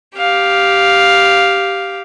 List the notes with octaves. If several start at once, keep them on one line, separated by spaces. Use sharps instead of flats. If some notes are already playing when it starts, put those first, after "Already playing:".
G4 F5